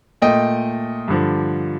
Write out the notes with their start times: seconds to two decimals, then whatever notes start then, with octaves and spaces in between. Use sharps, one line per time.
0.22 A#2 A3 D#5 G5
1.08 G2 D3 F3